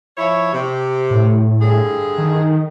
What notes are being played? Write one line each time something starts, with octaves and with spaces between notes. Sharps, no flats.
F3 E4 C#5
C3
A2
G2 D3 G#4
D#3